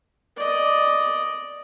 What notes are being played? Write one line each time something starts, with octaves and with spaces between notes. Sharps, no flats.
D5 D#5